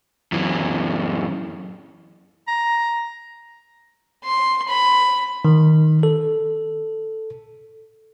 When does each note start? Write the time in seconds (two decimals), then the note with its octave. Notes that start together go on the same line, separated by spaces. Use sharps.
0.32 F#2 E3
2.48 A#5
4.24 C6
4.68 B5
5.45 D#3
6.03 A4